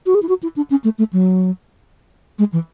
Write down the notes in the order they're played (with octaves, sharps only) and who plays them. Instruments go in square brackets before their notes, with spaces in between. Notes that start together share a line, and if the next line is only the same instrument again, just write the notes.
[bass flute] F#4
G#4
E4
F#4
E4
D4
C#4
A3
A3
F#3
G#3
E3